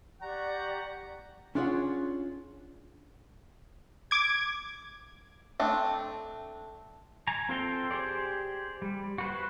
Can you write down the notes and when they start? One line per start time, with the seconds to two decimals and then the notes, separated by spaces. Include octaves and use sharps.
0.22 G4 D5 F#5 A#5 C#6
1.55 C#4 D4 F4 G#4 C#5 F#5
4.11 D6 G#6
5.60 A3 C4 D4
7.27 G#5 A#5
7.49 C4 F4 A4 C5 G5
7.91 G4 G#4 C5 D5
8.82 G3
9.18 F#4 B4 C5